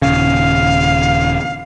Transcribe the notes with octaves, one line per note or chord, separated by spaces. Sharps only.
D#1 C#3 F5